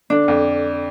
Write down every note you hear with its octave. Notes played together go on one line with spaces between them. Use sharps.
D3 D4
F2